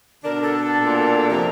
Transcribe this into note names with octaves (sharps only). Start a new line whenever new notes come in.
B2 D3 D4 A#4
A4
A#2
F2 C3 A#5